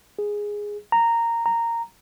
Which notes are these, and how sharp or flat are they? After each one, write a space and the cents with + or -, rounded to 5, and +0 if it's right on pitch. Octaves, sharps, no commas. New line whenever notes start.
G#4 -5
A#5 -10
A#5 -10